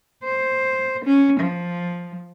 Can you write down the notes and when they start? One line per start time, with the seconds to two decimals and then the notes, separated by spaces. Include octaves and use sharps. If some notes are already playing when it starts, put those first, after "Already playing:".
0.24 C5
1.05 C#4
1.40 F3